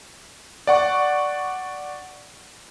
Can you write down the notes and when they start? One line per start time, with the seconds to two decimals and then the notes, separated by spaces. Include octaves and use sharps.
0.67 D5 F#5 C#6